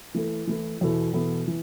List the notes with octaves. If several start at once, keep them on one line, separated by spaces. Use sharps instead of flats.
E3 A3 E4 A4
E3 A3 E4 A4
E2 B2 B3 E4 A4
E2 B2 B3 E4 A4
E3